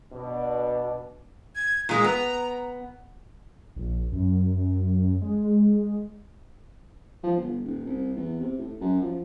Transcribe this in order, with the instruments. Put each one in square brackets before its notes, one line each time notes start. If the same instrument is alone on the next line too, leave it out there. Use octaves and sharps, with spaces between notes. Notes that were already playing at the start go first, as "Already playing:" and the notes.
[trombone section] B2 D4
[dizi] G#6
[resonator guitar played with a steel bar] A#2 G#3 [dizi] A#5
[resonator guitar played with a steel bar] B3
[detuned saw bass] A#1
F#2
G#3
[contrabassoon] F3
G1
D#1
C2
E2
C3
A2
F#2
F3